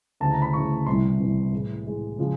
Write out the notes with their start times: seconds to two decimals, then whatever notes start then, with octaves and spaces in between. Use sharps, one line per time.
0.20 D2 C#3 E3 A3 A5
0.32 A#5
0.42 B5
0.53 D2 C#3 E3 A3 C#6
0.86 C2 C3 E3 G3 C6
1.20 C2 C3 E3 G3
1.53 A2 E3 G#3
1.86 A2 E3 G#3
2.18 C#3 F3 G#3